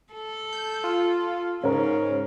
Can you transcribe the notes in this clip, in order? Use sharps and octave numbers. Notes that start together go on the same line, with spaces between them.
A4
G6
F4
G#2 C#3 C#4 A#4